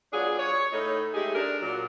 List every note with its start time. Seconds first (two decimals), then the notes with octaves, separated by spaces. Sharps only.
0.12 F#3 B3 D4 F4 G#4
0.39 C#5
0.72 A2 D#4
1.14 G#3 A3 D#4 G4 G#4
1.35 D4 A#4
1.62 A#2 F#3